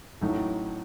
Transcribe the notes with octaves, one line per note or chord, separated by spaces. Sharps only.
A1 A2 F#3 A3 D#4